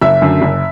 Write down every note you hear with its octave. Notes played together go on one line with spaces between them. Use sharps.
F#1 E5 E6
F#2 D3 A3
F#1